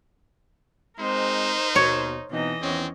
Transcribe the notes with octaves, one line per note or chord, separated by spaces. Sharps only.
G#3 C4 D#4 A#4 C5
D#2 B2 C#5
B2 E3 C4 D#4 D#5
E2 D#3 C4 C#4